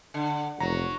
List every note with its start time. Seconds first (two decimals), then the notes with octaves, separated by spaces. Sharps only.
0.14 D3
0.60 F1 F#3 A#5